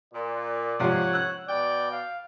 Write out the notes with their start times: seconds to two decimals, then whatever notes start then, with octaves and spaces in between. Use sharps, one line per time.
0.13 A#2 D5
0.80 G#2 C3 F3 C#5 F#5
1.13 E6 F#6
1.48 B2 D5 G5
1.91 F5